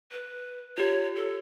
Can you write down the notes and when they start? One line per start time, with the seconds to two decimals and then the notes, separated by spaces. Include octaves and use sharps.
0.12 B4
0.78 F4 G4 C#5
1.16 A4